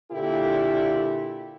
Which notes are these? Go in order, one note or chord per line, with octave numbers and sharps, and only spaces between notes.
A#2 D3 E4 G4 A4